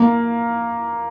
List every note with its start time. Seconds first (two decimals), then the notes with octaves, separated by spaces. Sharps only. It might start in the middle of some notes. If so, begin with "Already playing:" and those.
Already playing: A#3